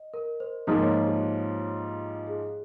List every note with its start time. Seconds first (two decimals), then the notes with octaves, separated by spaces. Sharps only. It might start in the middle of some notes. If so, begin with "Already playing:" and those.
Already playing: D#5
0.14 A#4
0.40 C5
0.67 G#2 F3 A#3 F4 C5
0.81 C#5
0.94 C5
1.07 G4
2.27 G#4